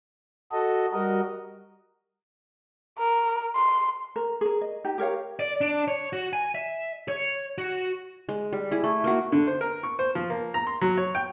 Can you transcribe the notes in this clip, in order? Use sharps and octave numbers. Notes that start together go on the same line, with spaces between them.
F#4 A4 D#5
G3 F#4 A#4 D#5
A#4
C6
A#4
G#4 A#4
D#5
D#4 G4
G4 A#4 C#5 F5
D5
D4
C#5
F#4
G#5
E5
C#5
F#4
G#3
G3
E4 G#4
A3
A#3 F#4
D3
C5
A#4
C#6
C5
F3
A#3
A#5
C6
F#3
C#5
G5